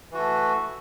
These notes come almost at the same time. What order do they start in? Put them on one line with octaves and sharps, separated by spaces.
E3 F#4 A3